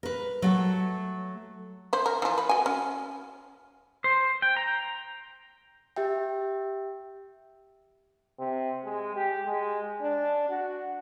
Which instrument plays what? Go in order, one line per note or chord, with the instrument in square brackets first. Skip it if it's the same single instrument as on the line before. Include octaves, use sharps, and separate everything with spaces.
[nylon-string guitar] A#4 B4
F#3 A3
[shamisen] B4 C5
A#4
E3 F3
B4
F#4 G#5
C#4
[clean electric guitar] C5
G5
A#5
[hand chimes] G4 E5 G5
[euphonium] C3
G#3
G4
G#3
D4
F#4